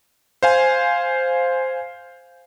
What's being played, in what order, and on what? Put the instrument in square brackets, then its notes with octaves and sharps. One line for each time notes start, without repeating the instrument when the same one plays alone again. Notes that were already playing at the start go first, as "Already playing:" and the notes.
[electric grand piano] C5 F5 G#5